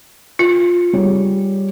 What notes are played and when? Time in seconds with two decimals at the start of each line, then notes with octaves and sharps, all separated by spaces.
0.39 F4
0.93 G3 G#4 C#5